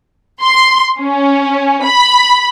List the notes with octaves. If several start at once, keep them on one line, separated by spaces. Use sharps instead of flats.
C6
C#4
B5